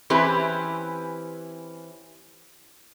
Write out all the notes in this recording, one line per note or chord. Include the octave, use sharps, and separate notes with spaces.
E3 C4 C#4 E4 G4 B4